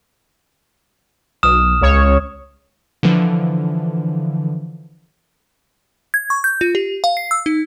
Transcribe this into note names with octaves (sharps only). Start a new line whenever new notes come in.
B1 D#6 F6 E7
C#2 C#5
D3 E3 F3
G#6
C#6
G6
F4
G4
F5
C7
E6
D#4